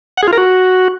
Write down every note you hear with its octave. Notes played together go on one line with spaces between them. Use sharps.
F#5
G#4
F4
A#4
F#4